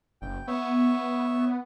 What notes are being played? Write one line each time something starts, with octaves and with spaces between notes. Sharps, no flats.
F#1 G5
B3 C#5 E5